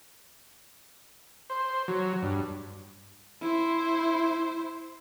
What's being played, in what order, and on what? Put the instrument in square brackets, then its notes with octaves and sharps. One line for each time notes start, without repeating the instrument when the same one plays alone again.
[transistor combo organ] C5
F#3
G2
[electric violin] E4 C5